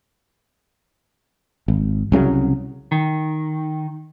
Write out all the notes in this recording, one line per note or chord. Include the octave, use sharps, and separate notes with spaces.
G#1
C2 C#3 F3 F#3
D#3